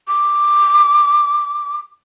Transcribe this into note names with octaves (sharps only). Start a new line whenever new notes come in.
D6